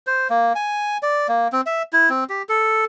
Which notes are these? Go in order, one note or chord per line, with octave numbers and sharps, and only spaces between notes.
C5
A#3
G#5
D5
A#3
C4
E5
E4
C4
G4
A4